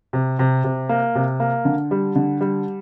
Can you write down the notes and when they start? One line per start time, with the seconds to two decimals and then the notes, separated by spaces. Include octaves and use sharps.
0.13 C3
0.39 C3
0.64 C3
0.89 A#3
1.15 C3
1.40 A#3
1.65 D3
1.91 G3
2.15 D3
2.41 G3